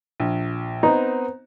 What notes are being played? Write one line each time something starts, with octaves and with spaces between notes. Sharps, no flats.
A#1
B3 C4 D#4